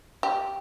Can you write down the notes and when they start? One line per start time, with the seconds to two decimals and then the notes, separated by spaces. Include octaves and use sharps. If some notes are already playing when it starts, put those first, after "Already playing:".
0.23 G4